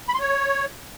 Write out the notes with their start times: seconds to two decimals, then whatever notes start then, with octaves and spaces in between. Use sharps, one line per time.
0.09 B5
0.14 C6
0.20 C#5